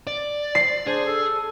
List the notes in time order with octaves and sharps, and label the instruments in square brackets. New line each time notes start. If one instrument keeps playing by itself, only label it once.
[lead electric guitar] D5
[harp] C7
[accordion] D4 C5 [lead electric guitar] G#4
[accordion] A4